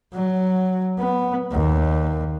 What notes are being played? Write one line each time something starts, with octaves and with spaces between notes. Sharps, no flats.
F#3
B3
D#2